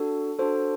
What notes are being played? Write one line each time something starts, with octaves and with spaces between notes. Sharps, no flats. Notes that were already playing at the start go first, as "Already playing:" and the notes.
Already playing: D4 F#4 A4
D4 F#4 A4 C5